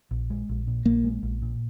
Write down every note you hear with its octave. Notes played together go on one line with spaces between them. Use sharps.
A#1
G#3
A#1
A#2
A#1 A#3
G#3
A#1
A#2